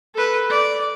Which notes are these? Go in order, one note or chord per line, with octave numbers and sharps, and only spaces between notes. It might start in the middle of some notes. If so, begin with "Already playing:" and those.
A4 B4
D5